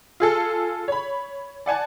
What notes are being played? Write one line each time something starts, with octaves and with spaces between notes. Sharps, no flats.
F4 G#4 A4
C#5 B5
D5 F#5 G#5 A5